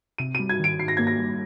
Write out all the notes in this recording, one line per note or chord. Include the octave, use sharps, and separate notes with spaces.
C3 D#7
G3 D#7
G#6
D#3 D7
D#3 C7
A#6
A#3 G#6
A#6
G3